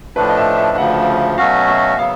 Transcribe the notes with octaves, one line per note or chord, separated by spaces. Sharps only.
A2 F3 A3 D4 B4
D#5
E5
E5
D2 C#3 F3 F#5
B2 F#3 A3 C#4 F#4 F5
E5
C#3 F#3 B3 F5